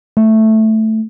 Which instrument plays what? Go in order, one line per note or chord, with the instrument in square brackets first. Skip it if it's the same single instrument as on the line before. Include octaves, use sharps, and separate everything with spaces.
[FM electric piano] A3